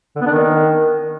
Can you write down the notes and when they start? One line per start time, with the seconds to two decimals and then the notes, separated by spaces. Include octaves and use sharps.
0.16 D3
0.21 B3
0.26 D4
0.31 D#3